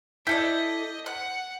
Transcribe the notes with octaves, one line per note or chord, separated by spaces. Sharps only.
E4 A4 D5 D#5 G6 B6
F#5 F#6